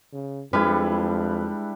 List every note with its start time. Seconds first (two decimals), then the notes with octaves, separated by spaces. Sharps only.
0.13 C#3
0.53 F2 G3 G#3 D4 E4 B4